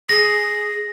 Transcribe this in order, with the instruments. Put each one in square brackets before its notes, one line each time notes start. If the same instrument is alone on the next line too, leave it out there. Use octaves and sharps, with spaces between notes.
[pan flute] G#4 [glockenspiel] A#6